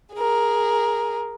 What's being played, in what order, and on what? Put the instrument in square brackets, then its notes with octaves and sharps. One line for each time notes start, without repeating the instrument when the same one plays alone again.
[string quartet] G#4 A#4